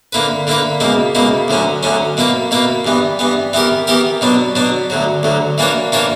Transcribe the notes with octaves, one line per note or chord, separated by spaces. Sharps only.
D3 A#3 E4 B4
D3 A#3 E4 B4
C#2 B2 A#3 E4
C#2 B2 A#3 E4
D2 D3 F#3 C#4
D2 D3 F#3 C#4
B2 A#3 E4 B4
B2 A#3 E4 B4
G2 E3 B3
G2 E3 B3
E3 B3 E4 G4 A#4
E3 B3 E4 G4 A#4
B2 F#3 B3 D4
B2 F#3 B3 D4
D2 D3 F#3
D2 D3 F#3
E3 A#3 D4 F#4 C#5
E3 A#3 D4 F#4 C#5